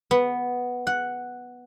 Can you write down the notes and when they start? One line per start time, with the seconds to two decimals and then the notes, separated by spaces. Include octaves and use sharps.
0.11 B3
0.87 F#5